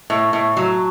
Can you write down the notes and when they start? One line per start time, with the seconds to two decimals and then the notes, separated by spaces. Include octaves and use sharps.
0.10 A2
0.33 A2
0.57 F#3